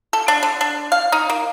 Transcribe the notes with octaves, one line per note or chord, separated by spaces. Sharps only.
A4
D4
D3
D4
F5
D#4
A#3